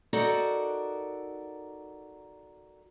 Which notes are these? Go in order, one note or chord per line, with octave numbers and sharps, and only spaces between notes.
D#4 F#4 A4 A#4 D5 F#5